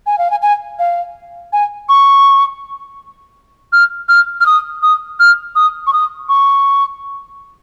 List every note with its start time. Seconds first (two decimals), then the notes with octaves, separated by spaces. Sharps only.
0.06 G#5
0.18 F5
0.31 G#5
0.42 G#5
0.79 F5
1.53 G#5
1.89 C#6
3.73 F6
4.09 F6
4.41 F6
4.46 D#6
4.83 D#6
5.20 F6
5.56 D#6
5.87 C#6
5.93 D#6
6.29 C#6